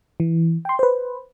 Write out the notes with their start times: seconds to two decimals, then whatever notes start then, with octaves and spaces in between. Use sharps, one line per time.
0.20 E3
0.65 G5 C6
0.79 B4 C5